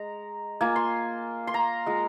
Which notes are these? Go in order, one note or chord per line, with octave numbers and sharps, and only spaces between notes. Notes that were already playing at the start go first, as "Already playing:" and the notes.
Already playing: G#3 A#5
A#3 F4 G#5
C6
C6
A#5
G#3 F4